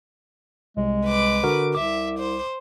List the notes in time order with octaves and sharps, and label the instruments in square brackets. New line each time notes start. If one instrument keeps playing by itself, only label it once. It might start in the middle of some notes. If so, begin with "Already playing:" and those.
[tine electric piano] C2 [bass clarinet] G#3
[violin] B4 D6
[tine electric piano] D3 F#4 A#4
[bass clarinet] C2 [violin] E5 [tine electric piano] D6
[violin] C5